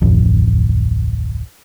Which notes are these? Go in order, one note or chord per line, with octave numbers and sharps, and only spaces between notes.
D1 A1 F2